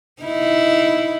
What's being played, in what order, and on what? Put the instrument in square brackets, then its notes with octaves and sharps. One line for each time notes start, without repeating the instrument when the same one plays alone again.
[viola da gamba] D#4 E4